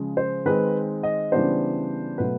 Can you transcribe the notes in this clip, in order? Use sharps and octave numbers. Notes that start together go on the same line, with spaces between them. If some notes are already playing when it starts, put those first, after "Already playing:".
Already playing: C#3 F3 G#3
C5
D#3 G#3 C4 D#4 B4
D#5
C#3 E3 G3 B3 D4 C5
B2 F#3 A3 B4